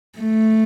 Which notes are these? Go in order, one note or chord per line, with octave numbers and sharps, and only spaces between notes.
A3